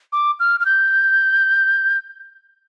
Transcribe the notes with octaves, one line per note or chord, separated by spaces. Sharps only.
D6
F6
F6
G6